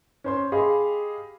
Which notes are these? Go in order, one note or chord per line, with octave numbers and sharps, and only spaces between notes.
C#4 C5 C6
G4 G#4 D#5 F5 B5 C6